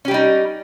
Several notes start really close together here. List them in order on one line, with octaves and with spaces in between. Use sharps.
C#4 G4 G3 D#4